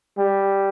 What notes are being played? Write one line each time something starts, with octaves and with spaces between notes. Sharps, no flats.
G3